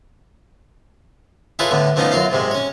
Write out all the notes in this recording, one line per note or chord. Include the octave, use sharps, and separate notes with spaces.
E4 F4 G#4 A4 B4 C#5
A2 D3 B3
F3 A3 B3 C#4 D#4 F4
F#2 F#3 F4 F5
G#2 C3 G#3
C#4 C#5